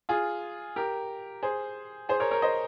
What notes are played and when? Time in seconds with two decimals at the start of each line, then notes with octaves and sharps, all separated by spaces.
0.09 F4 G#4
0.76 G4 A#4
1.43 G#4 C5
2.09 G#4 C5
2.20 A#4 C#5
2.31 A#4 C#5
2.42 C5 D#5